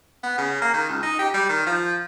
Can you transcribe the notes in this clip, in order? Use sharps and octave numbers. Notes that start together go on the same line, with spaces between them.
B3
C#3
A#3
D#3
C#2
D#4
G4
G3
D#3
F3